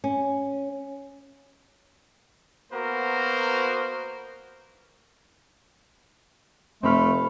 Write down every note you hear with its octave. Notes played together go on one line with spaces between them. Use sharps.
C#4
A#3 B3 F#4 A#4 C5
F1 A3 C4 B5 F6